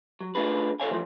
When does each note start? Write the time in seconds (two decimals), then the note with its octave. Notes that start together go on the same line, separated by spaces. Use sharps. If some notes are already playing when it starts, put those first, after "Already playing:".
0.20 F#3
0.35 A3 D4 F4 G#4 B4
0.80 A4 C5 C#5 F5 G#5
0.91 E3 F3 A3